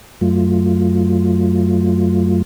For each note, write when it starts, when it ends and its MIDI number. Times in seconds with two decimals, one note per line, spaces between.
0.21 2.42 42
0.21 2.42 54
0.21 2.42 57
0.21 2.42 65